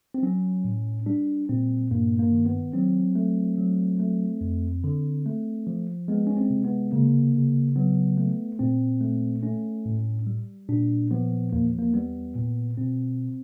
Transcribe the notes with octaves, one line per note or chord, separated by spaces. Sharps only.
C4
F#3 C#4
A2
G3 D4
A#2 C4
G2 A#3
A#3
D#3
B3
F#3 C4
A3
F#3
A3
F2
D3
A3
F3
G#3 B3
C#4
C4
C3
B3
C#3 A#3
C#3
F#3 B3
A3
A#2 C4
A3
A3 C#4
A2
G3
A#2 D4
F3 B3
E2 A#3
A#3
G3 B3
A#2
B2 C4